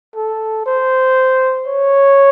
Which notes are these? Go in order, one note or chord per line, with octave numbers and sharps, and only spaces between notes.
A4
C5
C#5